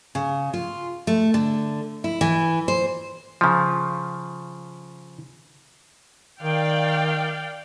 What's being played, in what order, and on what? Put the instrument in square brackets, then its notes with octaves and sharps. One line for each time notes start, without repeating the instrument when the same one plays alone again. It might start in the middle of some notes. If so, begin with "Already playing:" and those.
[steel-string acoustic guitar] C#3
F4
A3
D3
E4
E3
C5
[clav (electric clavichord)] C#3 F3
[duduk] D#3 [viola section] D5 F5 G5